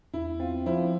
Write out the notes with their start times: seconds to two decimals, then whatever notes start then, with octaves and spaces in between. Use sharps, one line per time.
0.13 E2 E4
0.40 C4 F4
0.66 F3 E4